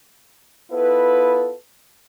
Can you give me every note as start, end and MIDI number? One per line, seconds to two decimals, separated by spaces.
0.72 1.54 59
0.72 1.54 64
0.72 1.54 65
0.72 1.54 69
0.72 1.54 71